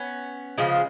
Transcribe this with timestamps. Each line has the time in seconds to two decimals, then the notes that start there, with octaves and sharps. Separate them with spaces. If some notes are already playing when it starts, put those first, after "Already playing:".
Already playing: B3 C#4
0.58 C#3 F3 G#3